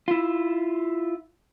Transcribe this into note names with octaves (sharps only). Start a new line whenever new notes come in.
E4 F4